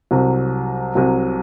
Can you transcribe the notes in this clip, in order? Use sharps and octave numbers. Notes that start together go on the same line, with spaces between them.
C2 C3 F#3
C2 C3 F#3